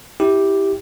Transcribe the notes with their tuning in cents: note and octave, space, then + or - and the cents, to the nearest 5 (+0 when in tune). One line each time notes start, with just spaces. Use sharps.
E4 -15 G4 +0